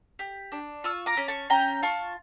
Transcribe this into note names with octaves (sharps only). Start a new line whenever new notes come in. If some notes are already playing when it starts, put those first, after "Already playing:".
G4
D4
F4 C#6 E6
A#5 D6
C#4
A5 C#6
C#4 G5 A#5
F4 A5 C#6